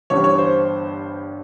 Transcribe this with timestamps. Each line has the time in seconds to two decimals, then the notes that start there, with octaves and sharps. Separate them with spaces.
0.10 G1 G2 E3 G3 C#5
0.24 C#5
0.38 C5